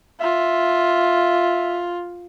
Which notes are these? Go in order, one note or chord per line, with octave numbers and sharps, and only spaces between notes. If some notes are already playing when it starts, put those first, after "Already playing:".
F4 E5